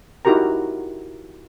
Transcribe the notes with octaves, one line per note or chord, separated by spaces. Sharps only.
D#4 E4 F#4 G4 A#4 A#5